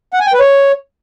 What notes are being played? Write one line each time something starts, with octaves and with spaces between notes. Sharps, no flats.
F#5
G#5
G5
B4
C#5